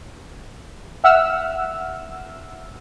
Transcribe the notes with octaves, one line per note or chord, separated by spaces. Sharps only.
E5 F#5 E6 F6